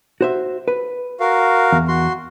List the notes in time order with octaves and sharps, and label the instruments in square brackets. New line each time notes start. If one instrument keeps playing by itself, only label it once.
[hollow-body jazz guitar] F#4 C5 E5
B4
[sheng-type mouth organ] F#4 A#4 F5
[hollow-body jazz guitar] E2
[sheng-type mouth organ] F#4 C6